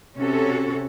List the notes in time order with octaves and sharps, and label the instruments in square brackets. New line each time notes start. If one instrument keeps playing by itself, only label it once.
[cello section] C3 C#4 F#4 A4